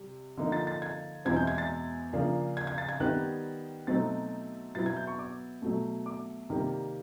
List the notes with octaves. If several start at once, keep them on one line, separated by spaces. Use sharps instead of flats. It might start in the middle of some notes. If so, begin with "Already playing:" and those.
Already playing: C3 G3
D3 F3 A#3 D#4
A6
A6
G#6
E2 B2 G#3 C4 E4 G#6
G6
G#6
A6
C#3 F3 A#3 D4
G#6
G#6
A6
G#6
D#3 G3 B3 F#6
B2 F#3 A3 C4 D#4 A6
B2 F#3 B3 E4 A6
G#6
G6
C#6
D6
B2 F#3 A3
D6
C3 D#3 G3 A#3